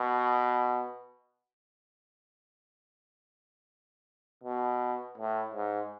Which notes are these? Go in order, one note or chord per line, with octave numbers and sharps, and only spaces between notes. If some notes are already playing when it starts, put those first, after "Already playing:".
Already playing: B2
B2
A2
G#2